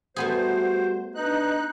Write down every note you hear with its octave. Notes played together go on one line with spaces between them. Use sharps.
G3 A3 B3 F#4 G#4 C5
D4 D#4 B4 F#6